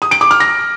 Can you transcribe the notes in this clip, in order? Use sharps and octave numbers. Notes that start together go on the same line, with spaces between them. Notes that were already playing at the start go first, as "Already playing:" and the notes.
D#6
D7
D6
F6
A#6